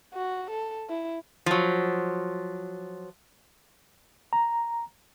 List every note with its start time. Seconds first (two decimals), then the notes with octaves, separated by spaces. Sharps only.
0.14 F#4
0.50 A4
0.89 E4
1.46 F3 F#3
4.33 A#5